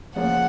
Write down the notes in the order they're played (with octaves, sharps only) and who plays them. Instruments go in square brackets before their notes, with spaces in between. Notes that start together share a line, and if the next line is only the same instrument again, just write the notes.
[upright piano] C#3 F3 A#3 C#4 F4 [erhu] F#5